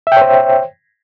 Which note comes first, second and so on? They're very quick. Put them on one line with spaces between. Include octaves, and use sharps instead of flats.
E5 G5 C#5 C5